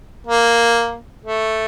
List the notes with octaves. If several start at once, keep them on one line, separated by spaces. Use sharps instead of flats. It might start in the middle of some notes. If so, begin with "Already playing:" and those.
A#3
A3